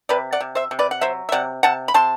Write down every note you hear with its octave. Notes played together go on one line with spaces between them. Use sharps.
C3 B4 D5
D5 F#5
C3
C5 E5
C3
B4 D5
F#5
F#3 C5 E5
E5
C3 D5 F#5
C3 F#5 A5
B5
C3 A5 C6